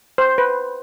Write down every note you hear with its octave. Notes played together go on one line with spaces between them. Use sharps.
C5
B4